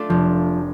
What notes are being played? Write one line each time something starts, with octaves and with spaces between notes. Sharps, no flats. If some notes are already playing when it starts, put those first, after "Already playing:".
Already playing: A3 D4 F4
F1 F3